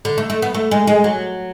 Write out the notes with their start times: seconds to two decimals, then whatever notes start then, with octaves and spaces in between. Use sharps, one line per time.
0.05 D3
0.18 A3
0.30 A3
0.42 B3
0.54 A3
0.71 G#3
0.87 G#3
1.04 F#3